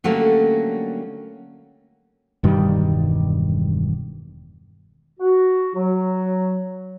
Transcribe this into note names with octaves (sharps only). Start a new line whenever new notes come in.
D3 F#3 G3 A3 A#3 C#4
E1 G2 D#3 G3
F#4
F#3